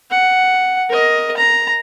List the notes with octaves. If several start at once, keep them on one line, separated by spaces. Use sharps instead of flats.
F#5
A#4 D#5
A#5